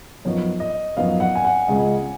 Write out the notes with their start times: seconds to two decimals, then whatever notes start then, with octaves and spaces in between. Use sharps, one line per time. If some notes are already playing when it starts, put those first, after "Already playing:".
0.25 F#2 F3 B3 D#4 C#5
0.60 D#5
0.97 F#2 F3 B3 D#4 F5
1.20 F#5
1.35 G#5
1.45 F#5
1.68 C#2 C#3 G#3